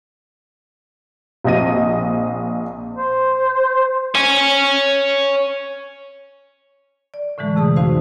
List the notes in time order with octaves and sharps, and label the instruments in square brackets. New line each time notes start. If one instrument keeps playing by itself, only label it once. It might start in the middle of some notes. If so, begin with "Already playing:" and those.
[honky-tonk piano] A#1 C4 D#5 A#6 D#7
[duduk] C5
[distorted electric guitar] C#5 G#5
[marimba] D5
A2 D3 E3 G#3 A3
F2 C3 G#4 A5 D#6
C4 D#4 F#4 C5 F5